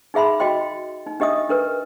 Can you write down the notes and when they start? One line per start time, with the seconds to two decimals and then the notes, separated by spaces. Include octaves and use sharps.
0.14 D#4 G#4 E5 B5 C6
0.40 F#4 D#5 G5 C6
1.06 D#4
1.20 D4 G4 D#5 E5 D#6
1.49 D4 A#4 B4